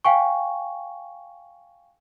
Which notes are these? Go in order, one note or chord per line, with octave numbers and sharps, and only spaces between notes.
F5 G5 G#5 C#6